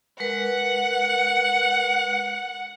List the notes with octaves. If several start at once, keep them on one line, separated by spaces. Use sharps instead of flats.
G#3 A#4 B4 F#5